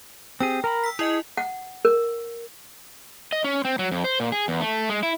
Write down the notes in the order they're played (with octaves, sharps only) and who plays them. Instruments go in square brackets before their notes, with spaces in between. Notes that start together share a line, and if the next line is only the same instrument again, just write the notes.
[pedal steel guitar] C4 G4 G#4 [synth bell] G5
[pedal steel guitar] A#4 A#5 B5
[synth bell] E6 B6
[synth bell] E4 D#5 G#5 [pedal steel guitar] G#4
[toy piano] F#5
A#4
[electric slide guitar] D#5
C#4
C4
F#3
F2
C5
A#2
G#4
E2
A3
G#3
E4